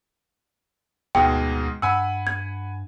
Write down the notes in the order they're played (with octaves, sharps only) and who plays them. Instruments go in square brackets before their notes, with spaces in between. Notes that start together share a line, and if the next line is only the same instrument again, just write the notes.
[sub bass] D2 [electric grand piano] G#2 B2 G#3 [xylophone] G5
[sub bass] G2 [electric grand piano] F#5 G#5 B5 [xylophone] E6
[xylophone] G#6